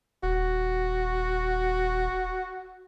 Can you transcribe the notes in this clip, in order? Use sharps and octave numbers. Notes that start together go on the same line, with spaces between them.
D#1 F#4